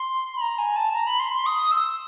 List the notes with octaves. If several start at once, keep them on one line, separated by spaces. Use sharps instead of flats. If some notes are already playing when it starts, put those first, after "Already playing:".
Already playing: C6
B5
A#5
G#5
A5
A#5
B5
C6
C6
D#6
E6